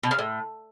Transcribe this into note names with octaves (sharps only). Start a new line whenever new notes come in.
B2
C#3
A2